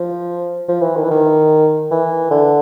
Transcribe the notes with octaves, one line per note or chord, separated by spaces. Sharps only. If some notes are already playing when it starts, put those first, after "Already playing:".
Already playing: F3
F3
E3
D#3
E3
D#3
E3
D3